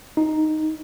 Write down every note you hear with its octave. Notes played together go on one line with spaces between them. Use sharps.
D#4